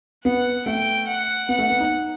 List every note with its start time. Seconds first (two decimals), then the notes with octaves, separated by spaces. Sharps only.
0.24 B3 F#5
0.66 A3 G5
1.07 F#5
1.49 B3 F#5
1.59 A3
1.70 B3
1.80 D#4